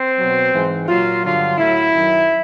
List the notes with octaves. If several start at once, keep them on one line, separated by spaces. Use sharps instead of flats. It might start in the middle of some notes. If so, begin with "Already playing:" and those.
Already playing: C4
B2 F#3
G#2 E3
A#2 F#3 F4
G2 D3 F#3 F4
A2 F#3 E4
F#2 D#3 F#3